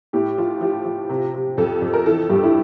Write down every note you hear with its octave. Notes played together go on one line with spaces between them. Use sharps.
A2 G4
F3 F4
F3 G4
F3
C3
C3
F2 A4
F2
A#4
E3 A4
G2 G4
E4